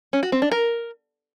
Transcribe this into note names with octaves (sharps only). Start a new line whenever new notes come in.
C#4
F#4
C4
D4
A#4